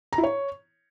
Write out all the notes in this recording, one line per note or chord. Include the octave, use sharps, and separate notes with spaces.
A#5
E4
C#5